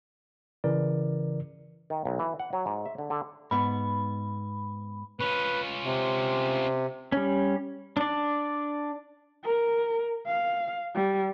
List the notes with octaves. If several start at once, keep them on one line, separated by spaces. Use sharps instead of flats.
C#3 E3 A#4 D5
D#3
B1
E3
F#5
F#3
G#2
E5
D3
D3
G#2 B3 B5
C#4 F4 B4
C3
G3 C#4
D4 D5
A#4
F5
G3